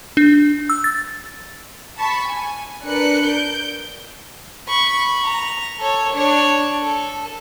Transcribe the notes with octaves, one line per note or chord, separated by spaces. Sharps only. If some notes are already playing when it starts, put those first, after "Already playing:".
D4
E6
A6
A5 B5 C#6
G#5
D4 A#4 B4 D5 F#6 C#7
G6 D7
B5 C#6
A#5
A4 C#5
D4 C#5
A4